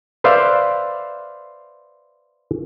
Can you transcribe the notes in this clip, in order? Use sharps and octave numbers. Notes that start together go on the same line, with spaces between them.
B4 C5 D5 E5 F5